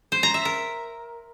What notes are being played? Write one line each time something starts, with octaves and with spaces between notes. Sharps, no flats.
C5
A#5
E5
A#4